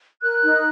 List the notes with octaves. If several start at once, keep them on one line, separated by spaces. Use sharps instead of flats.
A#4 F#6
D#4